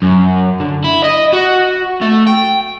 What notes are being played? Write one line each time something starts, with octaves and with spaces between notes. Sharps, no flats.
F#2
D3
E4
D#5
F#4
A3
G5